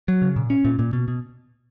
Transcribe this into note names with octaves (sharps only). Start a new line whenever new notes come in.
F#3
C#3
A#2
C#4
A#2
A#2
B2
B2